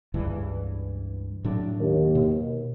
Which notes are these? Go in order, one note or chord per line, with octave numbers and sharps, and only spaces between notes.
C#2 G2 E3
A2 F#3 D4
D#2
B2